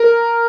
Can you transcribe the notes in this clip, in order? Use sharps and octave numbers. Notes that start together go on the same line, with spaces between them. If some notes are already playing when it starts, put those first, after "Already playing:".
Already playing: A#4